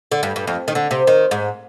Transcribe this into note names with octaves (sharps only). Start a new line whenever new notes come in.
D3
G2
G2
F2
D#3
D3
C3
D#3
G#2